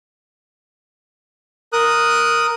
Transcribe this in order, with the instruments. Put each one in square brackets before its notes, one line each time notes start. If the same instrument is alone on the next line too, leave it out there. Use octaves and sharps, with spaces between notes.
[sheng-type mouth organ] A#4 D#6 F#6